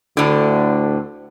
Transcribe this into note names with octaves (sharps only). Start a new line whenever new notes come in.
D2 A2 D3